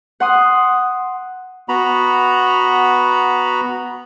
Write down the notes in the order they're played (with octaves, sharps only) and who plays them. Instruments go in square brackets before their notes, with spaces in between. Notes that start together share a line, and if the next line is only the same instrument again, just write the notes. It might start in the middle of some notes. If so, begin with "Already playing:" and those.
[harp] F#5 C6 D#6
[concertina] B3 F#4 A#5 B5